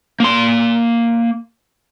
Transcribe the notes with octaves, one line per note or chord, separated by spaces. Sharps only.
A#3 C6